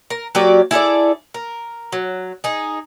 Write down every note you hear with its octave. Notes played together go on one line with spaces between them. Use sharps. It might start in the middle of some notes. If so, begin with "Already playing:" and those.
A#4
F#3 A#3 G4 D5
E4 G#4 A4 D5
A#4
F#3
D#4 G#4